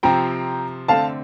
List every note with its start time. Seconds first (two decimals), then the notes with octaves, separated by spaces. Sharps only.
0.03 C3 F3 C4 G5 A#5
0.88 D3 A3 C4 F5 A5